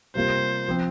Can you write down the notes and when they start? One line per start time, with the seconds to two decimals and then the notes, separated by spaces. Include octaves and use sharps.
0.15 C3 G3 A#3 F4 C5
0.68 F3 C4